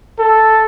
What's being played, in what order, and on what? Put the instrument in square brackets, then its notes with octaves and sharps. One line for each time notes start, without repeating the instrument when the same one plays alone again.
[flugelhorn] A4